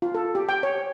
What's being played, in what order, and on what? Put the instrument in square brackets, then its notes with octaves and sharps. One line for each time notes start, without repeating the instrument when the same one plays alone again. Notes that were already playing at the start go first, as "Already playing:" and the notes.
[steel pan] F4
A4
G4
G5
C#5